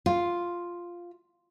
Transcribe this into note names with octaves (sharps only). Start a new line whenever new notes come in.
F4